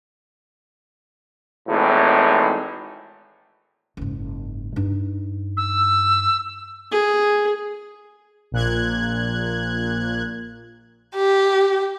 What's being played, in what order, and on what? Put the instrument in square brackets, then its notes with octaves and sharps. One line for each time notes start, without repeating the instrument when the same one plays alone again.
[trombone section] G#1 E2 A2
[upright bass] F#1 G#2
G2 D#4
[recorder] E6
[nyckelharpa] G#4
[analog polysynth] A#1 A#2 F#6 G#6
[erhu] G4